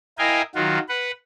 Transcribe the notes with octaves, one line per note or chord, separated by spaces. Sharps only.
E4 A#4 D#5 F5 G5 G#5
D#3 F#3 F4 F#4
B4 F#5